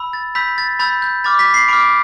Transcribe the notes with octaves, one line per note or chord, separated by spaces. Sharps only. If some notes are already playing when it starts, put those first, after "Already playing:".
Already playing: B5 E6
A6
B5 E6 G6 B6
A6
B5 E6 G6 A6
G6
B5 D6 F6 A6
B6
C7
B5 D6 F6 D7